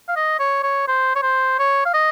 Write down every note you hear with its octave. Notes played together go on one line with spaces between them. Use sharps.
F5
D#5
C#5
C#5
C5
C#5
C5
C#5
F5
D#5